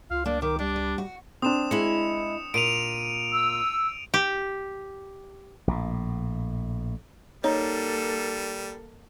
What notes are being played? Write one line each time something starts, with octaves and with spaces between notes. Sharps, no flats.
C#2 F4 F5
A#3 D4 D5
D#3 A#4 D6
G3 D4 D5
B4
F#4
C4 D4 D#6 E7
G#3 E4 C#7
A#2 D7 D#7 F7
E6
G4
A#1 A2
G3 A#3 D#4 A4 C#5 D#5